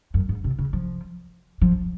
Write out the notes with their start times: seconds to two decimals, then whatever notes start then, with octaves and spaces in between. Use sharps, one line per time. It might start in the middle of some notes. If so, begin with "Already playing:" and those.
0.14 F#2
0.29 G#2
0.44 C3
0.59 C#3
0.73 F3
1.62 F3